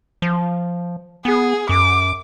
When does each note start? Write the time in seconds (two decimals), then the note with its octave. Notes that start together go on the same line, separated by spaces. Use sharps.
0.22 F3
1.25 B3 G#4
1.69 F#2 D6